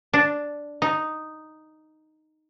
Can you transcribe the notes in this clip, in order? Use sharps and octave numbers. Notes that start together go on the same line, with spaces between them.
D4
D#4